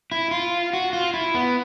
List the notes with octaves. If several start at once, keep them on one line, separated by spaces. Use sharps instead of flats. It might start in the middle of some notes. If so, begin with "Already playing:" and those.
E4
F4
F#4
F4
E4
B3